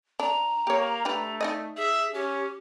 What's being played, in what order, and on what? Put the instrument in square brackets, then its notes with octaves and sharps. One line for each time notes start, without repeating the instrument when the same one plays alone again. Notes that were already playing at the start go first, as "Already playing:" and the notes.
[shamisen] D4 [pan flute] A#5
[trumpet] A#3 [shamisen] G4 C#5
[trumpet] A3 [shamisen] D4 G4 B4
[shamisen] D#4 D5 D#5
[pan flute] G#4 [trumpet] E5
[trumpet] C#4 [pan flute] G4